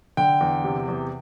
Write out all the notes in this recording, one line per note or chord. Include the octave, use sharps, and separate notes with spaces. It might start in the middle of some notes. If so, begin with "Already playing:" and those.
D3 G5
E2
C3
E2